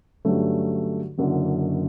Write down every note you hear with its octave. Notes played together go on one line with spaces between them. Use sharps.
G2 D3 F#3 A3 C#4
F#1 F#2 D3 F#3